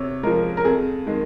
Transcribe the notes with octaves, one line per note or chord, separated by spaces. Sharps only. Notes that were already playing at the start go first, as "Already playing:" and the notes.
Already playing: C3 C#5
F3 G#3 A#4
A#4
F2 G#4
D#3 G#3